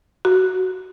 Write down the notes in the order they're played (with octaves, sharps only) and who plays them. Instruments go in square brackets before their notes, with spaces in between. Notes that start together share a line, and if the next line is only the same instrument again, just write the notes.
[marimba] F#4